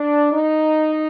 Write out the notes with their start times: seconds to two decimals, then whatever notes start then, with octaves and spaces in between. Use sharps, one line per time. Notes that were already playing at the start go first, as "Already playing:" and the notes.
Already playing: D4
0.33 D#4